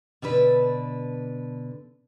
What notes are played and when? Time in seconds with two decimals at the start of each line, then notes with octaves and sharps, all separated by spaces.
0.22 B2 D3 D4 B4